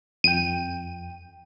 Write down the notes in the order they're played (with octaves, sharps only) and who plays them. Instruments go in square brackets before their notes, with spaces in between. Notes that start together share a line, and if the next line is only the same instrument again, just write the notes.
[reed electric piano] F2 G5 [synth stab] D#7